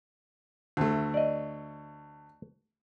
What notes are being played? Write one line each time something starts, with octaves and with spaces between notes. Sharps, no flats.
D2 A3
D5 D#5